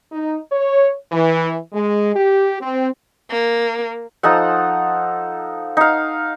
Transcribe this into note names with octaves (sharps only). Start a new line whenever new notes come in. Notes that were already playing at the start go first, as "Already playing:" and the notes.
D#4
C#5
E3
G#3
G4
C4
A#3
F3 D#4 A4 F#5
D#4 F5